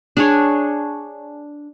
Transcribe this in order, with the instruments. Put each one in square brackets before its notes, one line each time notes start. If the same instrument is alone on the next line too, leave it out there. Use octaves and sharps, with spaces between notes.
[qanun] D4 G#4 C#5